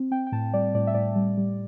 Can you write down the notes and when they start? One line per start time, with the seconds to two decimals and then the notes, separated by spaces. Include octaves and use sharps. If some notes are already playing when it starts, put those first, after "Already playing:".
Already playing: C4
0.11 C4 G5
0.27 G5
0.32 A2 A5
0.53 G3 D5
0.74 A2 D5
0.87 E5
0.94 A2 D5
1.15 G3
1.37 G3